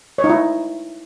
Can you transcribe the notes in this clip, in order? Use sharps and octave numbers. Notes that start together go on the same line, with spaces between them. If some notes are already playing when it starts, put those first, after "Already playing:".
C#5
D#4
E4